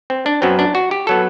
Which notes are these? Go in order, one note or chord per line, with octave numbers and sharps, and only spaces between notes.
C4
D4
F#2 F#3 B3 C4
D4
F#4
G4
F#3 B3 A4